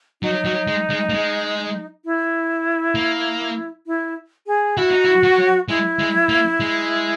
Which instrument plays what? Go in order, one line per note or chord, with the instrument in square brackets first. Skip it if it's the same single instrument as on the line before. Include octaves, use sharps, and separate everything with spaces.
[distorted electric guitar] F#3 [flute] D#4
[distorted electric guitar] F#3
G#3
G#3
A#3
G#3
[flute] E4
[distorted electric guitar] A#3
[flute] E4
G#4
[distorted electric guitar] E4 [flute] F#4
[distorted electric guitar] D#4
E4
F#3
[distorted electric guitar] G#3 [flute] E4
[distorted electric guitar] G#3
A#3
G#3